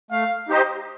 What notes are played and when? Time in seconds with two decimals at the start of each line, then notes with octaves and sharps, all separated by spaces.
0.11 A3 F5
0.49 D#4 G4 C5 D#5